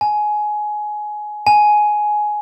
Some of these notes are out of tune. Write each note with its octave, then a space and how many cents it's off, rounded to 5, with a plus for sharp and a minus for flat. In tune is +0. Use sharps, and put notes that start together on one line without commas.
G#5 +20
G#5 +15